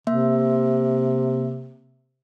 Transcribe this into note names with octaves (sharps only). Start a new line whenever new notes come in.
C3 A#3 E5